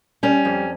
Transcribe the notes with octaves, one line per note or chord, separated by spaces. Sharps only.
G3 C#4
F2